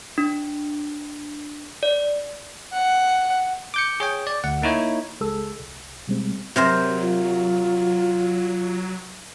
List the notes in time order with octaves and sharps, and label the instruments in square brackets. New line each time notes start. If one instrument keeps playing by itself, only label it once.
[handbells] D4
D5
[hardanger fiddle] F#5
[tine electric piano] D6 G6 C#7
G#4 C#5 G5
D5
D2 F#5
A#3 D#4 E4 C#5
[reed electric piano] C#2 G#3 G#4 A4 E6
C2
B2 G3 G#3 C4
[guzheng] C3 A#4 C5 [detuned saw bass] F#3
[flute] F4